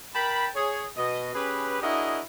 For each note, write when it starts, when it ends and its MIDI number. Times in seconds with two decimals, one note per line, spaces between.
0.14 0.49 70
0.14 0.49 79
0.14 0.49 81
0.14 0.49 83
0.55 0.85 68
0.55 0.85 73
0.97 1.33 47
0.97 1.33 75
1.35 1.81 61
1.35 1.81 67
1.35 1.81 68
1.35 1.81 71
1.82 2.21 62
1.82 2.21 64
1.82 2.21 66
1.82 2.21 68
1.82 2.21 70
1.82 2.21 75